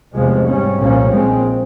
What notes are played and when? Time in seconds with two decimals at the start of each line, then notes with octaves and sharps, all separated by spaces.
0.13 F1 E2 C3 F3 G#3
0.46 G#2 G3 C#4
0.79 C2 A#2 F3 A#3 C#4
1.12 A#1 A#2 G#3 C4